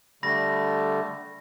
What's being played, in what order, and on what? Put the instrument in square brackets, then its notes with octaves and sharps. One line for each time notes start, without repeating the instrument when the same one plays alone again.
[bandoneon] D3 G3 A3 [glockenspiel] B5 A#6